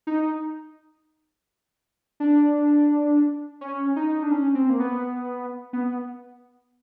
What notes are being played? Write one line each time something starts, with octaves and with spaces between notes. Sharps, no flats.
D#4
D4
C#4
D#4
D4
C#4
C4
A#3
B3
B3